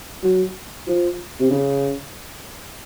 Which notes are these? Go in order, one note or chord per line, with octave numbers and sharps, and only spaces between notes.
F#3
F3
C3
C#3